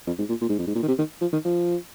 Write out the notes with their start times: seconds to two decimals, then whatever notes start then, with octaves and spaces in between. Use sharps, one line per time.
0.07 F2
0.18 G#2
0.29 A#2
0.41 A#2
0.49 G#2
0.59 F2
0.67 G#2
0.75 A#2
0.83 D#3
0.88 C3
0.98 D#3
1.21 F3
1.33 D#3
1.45 F3